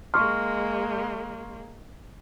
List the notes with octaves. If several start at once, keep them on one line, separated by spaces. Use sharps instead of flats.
G#3 A#3 C6 C#6 F6